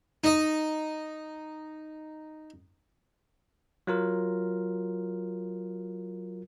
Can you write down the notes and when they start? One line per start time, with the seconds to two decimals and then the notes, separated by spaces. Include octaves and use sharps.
0.24 D#4 D#5
3.87 F#3 F4 A#4